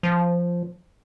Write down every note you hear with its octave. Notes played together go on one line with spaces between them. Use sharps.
F3